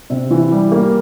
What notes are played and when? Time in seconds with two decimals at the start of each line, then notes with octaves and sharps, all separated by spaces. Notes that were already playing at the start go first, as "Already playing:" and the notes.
0.10 C3
0.30 E3
0.52 G3
0.72 A#3